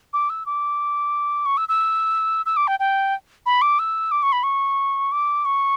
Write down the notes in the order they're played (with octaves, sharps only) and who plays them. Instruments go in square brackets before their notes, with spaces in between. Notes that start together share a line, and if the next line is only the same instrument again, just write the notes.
[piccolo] D6
E6
D6
C#6
E6
E6
E6
D6
G5
G5
B5
D6
E6
D6
C#6
B5
C#6
D6
C#6